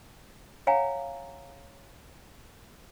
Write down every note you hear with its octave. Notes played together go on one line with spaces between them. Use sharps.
C#5 F5 F#5 G#5 A#5